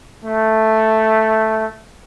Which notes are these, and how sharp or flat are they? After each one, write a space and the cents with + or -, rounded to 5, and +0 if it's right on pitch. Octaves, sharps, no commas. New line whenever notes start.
A3 +0